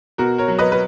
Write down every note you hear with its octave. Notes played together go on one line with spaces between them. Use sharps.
B2 F#4 A#4
A#4 C#5
F#3
B4 D#5
B4